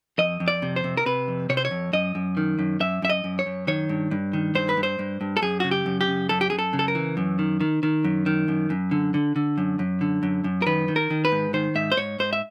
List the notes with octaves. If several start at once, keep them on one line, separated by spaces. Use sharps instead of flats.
F2 D#5
F2
D5
C3
C5
C3
A#4
C3 B4
F2
C3 C#5
C5
C#5
F2
F#2 D#5
F#2
D#3
F#2
F#2 E5
F#2 E5
D#5
F#2
C#5
F#2
D#3 C#5
G2
G2
D#3
G2 C5
B4
G2
C5
G2
G2
A4
F#2 G#4
C#3 F#4
G4
F#2
G4
C#3
F#2 A4
G4
F#2 G#4
A4
C#3
A4
A#4
E3
F#2
D#3
D#3
D#3
F#2
D#3
F#2
F#2
D3
D3
D3
F#2
F#2
D3
F#2
F#2
A#4
D#3 B4
D#3
A#4
D#3
B4
G#2
D#3 C5
G#2 E5
C5
G#2 C#5
G#2 C5
E5